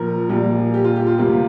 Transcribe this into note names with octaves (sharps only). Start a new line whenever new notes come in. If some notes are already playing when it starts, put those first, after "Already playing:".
Already playing: A#1 A#2 F3 A#4
A#1 A#2 G3 A#3
G4
F4
G4
F4
D2 C3 G3 A#3